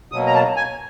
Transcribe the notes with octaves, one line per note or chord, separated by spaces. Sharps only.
B2 F#3 A#3 D#6
A#5
A5
G#5